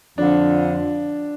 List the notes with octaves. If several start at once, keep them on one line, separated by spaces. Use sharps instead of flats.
F2 D3 F3 D4